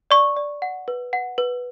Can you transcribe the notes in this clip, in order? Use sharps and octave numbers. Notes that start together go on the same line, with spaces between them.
D5 C#6
D5
F#5
B4
F#5
B4